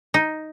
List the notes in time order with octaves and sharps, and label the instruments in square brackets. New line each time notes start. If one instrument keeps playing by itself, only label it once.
[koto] D#4